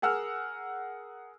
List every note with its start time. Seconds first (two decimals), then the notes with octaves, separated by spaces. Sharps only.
0.02 G#4 A#4 F#5 E6 F6